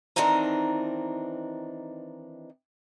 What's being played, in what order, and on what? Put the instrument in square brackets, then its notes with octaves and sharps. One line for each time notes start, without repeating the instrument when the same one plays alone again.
[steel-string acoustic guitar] D#3 E3 C4 D4 D#4 A#5